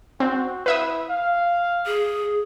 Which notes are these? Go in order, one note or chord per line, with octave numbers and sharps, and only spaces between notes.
C4 F#4
E4 B4 E5 D#6
F5
G#4